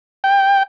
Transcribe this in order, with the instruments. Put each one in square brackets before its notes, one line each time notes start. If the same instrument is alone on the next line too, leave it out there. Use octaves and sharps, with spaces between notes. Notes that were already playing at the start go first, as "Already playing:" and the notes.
[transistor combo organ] G5